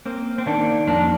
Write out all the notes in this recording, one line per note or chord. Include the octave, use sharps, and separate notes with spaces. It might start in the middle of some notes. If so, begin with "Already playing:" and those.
A#3 C4
C4
D#3 A#3 D4
F2 A#3 D4